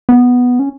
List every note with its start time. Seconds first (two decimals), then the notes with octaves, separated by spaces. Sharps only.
0.09 B3
0.59 C#4